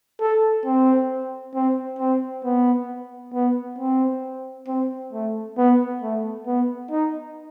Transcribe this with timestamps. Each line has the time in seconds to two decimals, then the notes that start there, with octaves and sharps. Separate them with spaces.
0.21 A4
0.65 C4
1.55 C4
1.99 C4
2.45 B3
3.34 B3
3.78 C4
4.68 C4
5.13 A3
5.58 B3
6.02 A3
6.47 B3
6.91 D#4